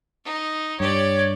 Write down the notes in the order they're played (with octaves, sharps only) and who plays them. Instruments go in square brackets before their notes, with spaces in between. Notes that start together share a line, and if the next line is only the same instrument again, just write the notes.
[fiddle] D#4
[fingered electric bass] G2 [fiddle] G4 D5 [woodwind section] C#5